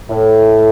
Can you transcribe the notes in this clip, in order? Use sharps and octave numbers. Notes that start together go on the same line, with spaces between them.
A2